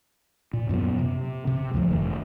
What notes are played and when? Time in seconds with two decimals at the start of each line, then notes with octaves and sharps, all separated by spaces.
0.53 A#2
0.69 F#2 A#2 F#3 B3
0.99 C3
1.47 C3
1.74 D2 G2 F3 A3
1.90 F1 D#3 A3